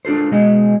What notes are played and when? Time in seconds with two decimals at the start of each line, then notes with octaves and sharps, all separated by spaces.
0.05 D4 F4 A4 C5
0.31 B2 G#3 G#4 D#5